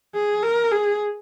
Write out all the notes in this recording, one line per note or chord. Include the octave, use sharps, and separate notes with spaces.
G#4
A#4
G#4